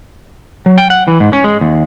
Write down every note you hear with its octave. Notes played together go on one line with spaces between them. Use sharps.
F#3
G5
F#5
E3
G#2
C#4
G#3
D#2